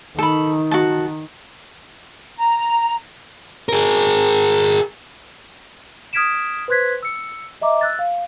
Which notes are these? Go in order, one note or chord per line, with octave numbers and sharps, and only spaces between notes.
D#3 A4 B5
F#4 A5
A#5
G#4 A#4
D#6 F6 G#6 B6 D7 E7
B4 C5 C6 F#6 G#6 B6
E6 C#7
D#5 E5 A#5 D6
E6 F#6 A6
F5